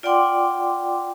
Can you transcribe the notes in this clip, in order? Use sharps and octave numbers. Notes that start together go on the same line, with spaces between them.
F4 D5 F#5 G5 C6 D6